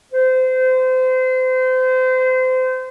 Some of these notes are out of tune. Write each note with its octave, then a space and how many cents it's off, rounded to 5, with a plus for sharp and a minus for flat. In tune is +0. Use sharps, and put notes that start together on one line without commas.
C5 -30